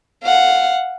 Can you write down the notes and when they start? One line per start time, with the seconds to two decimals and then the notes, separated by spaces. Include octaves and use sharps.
0.24 F5 F#5